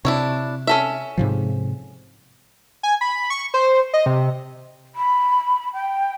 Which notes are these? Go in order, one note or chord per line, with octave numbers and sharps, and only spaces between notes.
C3 D4 E4 C#5
C#4 A4 E5
G#2 C3 F3
G#5
B5
C#6
C5
D#5
C3
B5
G5